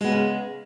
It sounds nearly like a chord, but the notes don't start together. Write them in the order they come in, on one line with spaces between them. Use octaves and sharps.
G#3 B3 C#3 C#4